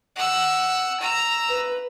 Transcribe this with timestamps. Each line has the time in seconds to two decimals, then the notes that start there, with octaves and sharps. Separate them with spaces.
0.16 F#5 E6
1.00 A#5 E6
1.49 B4